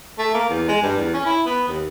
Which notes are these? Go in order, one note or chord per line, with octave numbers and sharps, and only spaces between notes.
A3
A#3
E2
G#3
G2
E2
C#4
E4
B3
D#2